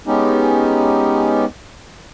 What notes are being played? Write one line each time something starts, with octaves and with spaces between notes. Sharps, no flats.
G#3 B3 C#4 D#4 G4